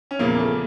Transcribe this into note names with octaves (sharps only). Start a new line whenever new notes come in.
C#4
E2 A#2 C#3 F3 A#3
A3